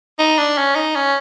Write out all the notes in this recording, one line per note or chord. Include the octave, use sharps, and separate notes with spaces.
D#4
D4
C#4
D#4
C#4